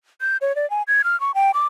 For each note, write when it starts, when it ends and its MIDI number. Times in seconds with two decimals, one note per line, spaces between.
0.21 0.37 91
0.41 0.55 73
0.56 0.69 74
0.70 0.83 80
0.88 1.02 92
1.04 1.19 89
1.20 1.32 85
1.35 1.51 79
1.54 1.67 86